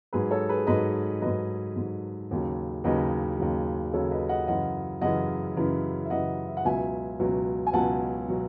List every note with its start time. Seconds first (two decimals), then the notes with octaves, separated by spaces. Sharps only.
0.13 G#2 F#3 G#4 B4
0.31 A4 C#5
0.49 G#4 B4
0.67 G#2 F#3 B4 D#5
1.21 G#2 F#3 B4 D#5
1.76 G#2 F#3
2.31 D#2 C#3 F#3
2.84 D#2 C#3 F#3 B4 D#5
3.38 D#2 C#3 F#3
3.93 D#2 C#3 F#3 A4 C#5
4.11 B4 D#5
4.29 D#5 F#5
4.47 F#2 C#3 E3 D#5 F#5
5.01 F#2 C#3 E3 D#5 F#5
5.57 F#2 C#3 E3
6.05 E5
6.10 F#2 C#3 E3 D#5 F#5
6.48 E5
6.57 F#5
6.65 C#2 B2 F#3 E5 G#5
7.20 C#2 B2 F#3
7.67 G#5
7.73 C#2 B2 F#3 F#5 A5
8.28 B2 F#3